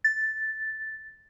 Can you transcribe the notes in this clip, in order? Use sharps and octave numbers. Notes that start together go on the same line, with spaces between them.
A6